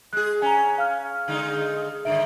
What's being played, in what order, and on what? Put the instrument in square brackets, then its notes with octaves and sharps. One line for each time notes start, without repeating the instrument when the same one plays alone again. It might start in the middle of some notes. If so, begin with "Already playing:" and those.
[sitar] G#3 G#4 [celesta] F#6
[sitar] C#4 [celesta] G#5 A#5
[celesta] F5 F6
[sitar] D3 G#3 D#4
[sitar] G2 D3 D#3 [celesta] E5 D7